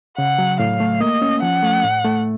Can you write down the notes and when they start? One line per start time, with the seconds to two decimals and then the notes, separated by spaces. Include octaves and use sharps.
0.17 C#3 F#5
0.39 F#3
0.59 A2 F5
0.80 A3
1.00 A#3 D#5
1.22 C#4
1.42 F3 F#5
1.63 A3
1.84 A2
2.05 A3